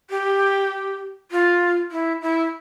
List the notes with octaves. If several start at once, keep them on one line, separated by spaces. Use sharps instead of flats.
G4
F4
E4
E4